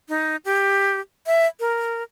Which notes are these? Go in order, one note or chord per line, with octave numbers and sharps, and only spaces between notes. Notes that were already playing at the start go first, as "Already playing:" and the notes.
D#4
G4
E5
A#4